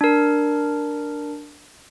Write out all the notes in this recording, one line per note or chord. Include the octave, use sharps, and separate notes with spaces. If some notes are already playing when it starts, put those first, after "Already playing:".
D4 A#4